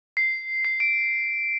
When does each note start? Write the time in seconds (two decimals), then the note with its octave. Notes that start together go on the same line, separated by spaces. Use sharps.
0.17 C7
0.65 C7
0.80 D7